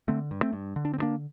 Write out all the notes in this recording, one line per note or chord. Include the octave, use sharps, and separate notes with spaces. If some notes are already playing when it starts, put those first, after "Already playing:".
D3 A3 C4
G2
A3 C4
G2
D3
D4
C4
G2
A#3 D4